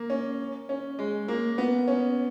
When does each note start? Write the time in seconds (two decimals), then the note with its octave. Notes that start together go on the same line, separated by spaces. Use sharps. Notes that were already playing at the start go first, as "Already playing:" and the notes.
Already playing: A#3
0.10 C#4
0.69 C#4
0.99 G#3
1.28 A#3
1.58 B3
1.88 C#4